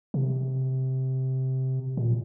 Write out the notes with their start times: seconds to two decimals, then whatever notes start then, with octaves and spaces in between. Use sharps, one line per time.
0.14 C3
1.97 A#2